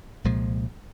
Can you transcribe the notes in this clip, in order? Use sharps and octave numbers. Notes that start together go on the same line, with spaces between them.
C2 A#2 F3 G#3